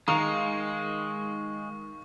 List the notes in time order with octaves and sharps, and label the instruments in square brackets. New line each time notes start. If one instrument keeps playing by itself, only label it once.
[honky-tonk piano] D#3 F5 F7 [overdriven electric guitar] G#3 [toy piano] A#5 [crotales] C#6